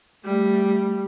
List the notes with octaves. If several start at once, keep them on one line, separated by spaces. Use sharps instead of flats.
G3 A3